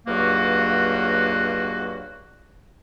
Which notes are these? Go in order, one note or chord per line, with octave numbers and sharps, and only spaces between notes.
C#2 G2 F#3 A#3 F#4